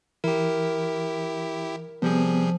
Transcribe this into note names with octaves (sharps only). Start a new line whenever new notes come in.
E3 E4 G4 A#4
C3 F3 G3 B3 G#4